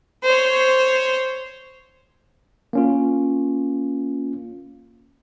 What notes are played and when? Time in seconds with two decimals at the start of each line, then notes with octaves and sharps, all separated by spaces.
0.23 C5 C#5
2.73 A#3 C#4 F4